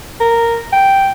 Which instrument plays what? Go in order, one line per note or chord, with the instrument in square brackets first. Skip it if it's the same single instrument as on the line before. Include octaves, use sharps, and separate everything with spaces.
[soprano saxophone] A#4
G5